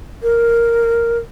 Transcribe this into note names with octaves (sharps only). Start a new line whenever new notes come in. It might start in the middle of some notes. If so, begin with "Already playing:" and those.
A#4